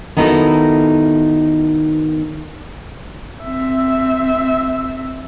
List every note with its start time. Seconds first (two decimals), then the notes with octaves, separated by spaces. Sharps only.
0.17 D#3 B3 D#4 E4 F#4 A4
3.42 C4 E5